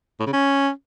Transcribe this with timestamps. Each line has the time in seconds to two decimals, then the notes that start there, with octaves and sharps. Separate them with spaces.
0.20 A2
0.26 C#3
0.33 C#4